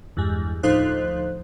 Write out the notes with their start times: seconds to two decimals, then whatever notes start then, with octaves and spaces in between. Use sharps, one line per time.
0.17 E2 G2 G#3
0.63 D2 A2 F3 D#4 C5 F#6